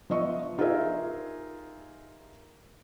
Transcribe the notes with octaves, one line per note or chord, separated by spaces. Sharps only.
F3 B3 D#5 E5 C#6
D#4 F4 G4 G#4 A#4 E5